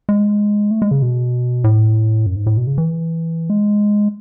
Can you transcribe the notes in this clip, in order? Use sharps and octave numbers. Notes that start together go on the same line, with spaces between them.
G#3
A3
G#3
C#3
B2
A2
F#2
G#2
A2
B2
C#3
E3
G#3